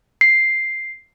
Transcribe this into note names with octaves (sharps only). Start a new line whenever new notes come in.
C7